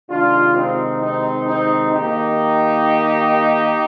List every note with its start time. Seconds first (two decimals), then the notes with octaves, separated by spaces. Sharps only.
0.10 C3 D#3 G#3 D4 F4
0.56 C4 D#4
1.02 C4 D#4
1.47 C4 D#4
1.92 D#3 A#3 D#4 G4